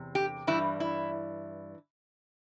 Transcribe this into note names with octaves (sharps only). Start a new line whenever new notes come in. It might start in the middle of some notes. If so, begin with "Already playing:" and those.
Already playing: E2 C3
G4
G2 E3 G3 E4
E4